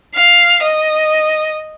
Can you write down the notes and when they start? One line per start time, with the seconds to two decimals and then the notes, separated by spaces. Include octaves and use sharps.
0.15 F5
0.63 D#5